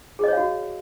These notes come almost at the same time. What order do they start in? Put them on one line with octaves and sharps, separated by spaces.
G#4 D#5 C#5 F5 F#4